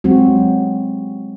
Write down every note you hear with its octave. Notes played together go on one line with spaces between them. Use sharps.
F#3 G#3 C4 F#4